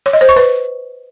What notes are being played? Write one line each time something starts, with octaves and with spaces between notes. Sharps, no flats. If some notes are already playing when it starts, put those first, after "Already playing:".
C#5
D#5
C5
C#6
B4